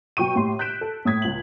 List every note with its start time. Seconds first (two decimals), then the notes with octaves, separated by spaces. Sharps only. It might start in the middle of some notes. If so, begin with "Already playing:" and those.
0.17 B2 F#3 G5 C#6 D#7
0.36 A2 G4 C6
0.59 F#6 G6 B6 D7 E7
0.81 A4
1.05 A2 D#6 G#6 B6
1.22 C#2 F#7